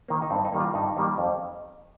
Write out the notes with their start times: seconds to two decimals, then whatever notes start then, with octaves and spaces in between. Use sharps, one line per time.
0.08 D#3 A#3
0.22 D#4
0.30 G2 C4
0.45 D#4
0.53 D#3 G3 A#3
0.60 F4
0.74 G2 D#4
0.97 D#3 G3 A#3
1.18 F2